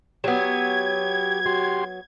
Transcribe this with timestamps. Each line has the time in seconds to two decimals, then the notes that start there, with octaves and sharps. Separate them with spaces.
0.24 F#3 B3 G4 G#6
1.46 F#4 G4 C6